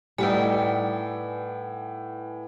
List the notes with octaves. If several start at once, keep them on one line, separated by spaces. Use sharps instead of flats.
A2 G3 D#4 B4 D5 F#5 G#5